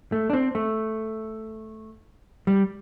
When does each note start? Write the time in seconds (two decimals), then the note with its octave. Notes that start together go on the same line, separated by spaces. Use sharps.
0.12 A3
0.30 D4
0.33 C4
0.55 A3
2.47 G3